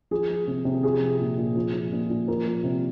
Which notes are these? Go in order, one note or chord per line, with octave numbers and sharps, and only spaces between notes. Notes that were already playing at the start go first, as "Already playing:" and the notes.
F3 G#4
F3
C3
C3
F3 G#4
F3
A#2
A#2
F3
F3
A#2
A#2
F3 A#4
F3
C3